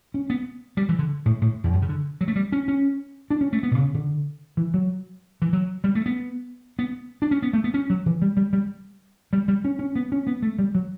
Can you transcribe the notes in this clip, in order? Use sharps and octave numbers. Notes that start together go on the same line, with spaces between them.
C#4
B3
G3
E3
D3
A2
A2
E2
F#2
C#3
D3
F#3
A3
G3
C#4
C#4
D4
C#4
A3
B3
B2
C#3
D3
E3
F#3
E3
F#3
G3
A3
B3
B3
D4
C#4
B3
A3
B3
C#4
F#3
E3
G3
G3
G3
G3
G3
C#4
C#4
B3
C#4
B3
A3
G3
F#3